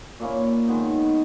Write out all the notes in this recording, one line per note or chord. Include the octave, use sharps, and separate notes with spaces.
A#2 A#3 C#4 E4
D#3 G#3 B3 D#4